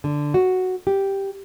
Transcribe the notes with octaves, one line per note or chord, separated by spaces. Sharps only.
D3
F#4
G4